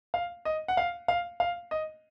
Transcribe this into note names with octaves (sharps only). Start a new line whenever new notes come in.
F5
D#5
F#5
F5
F5
F5
D#5